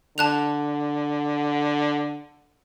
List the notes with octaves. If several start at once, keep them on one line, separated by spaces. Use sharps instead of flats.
D3 A5 F#6 F7